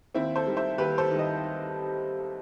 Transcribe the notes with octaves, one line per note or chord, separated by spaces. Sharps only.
D#2 C4 E4
A4 C5
D#3 G3
C5 E5
D#2 G4 B4
A4 C5
D#3 G3
D#5